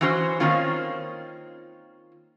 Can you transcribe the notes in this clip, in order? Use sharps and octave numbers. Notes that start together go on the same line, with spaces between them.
E3 F#3 C#4 F#4 C5
D#3 A#3 C4 C#4 F4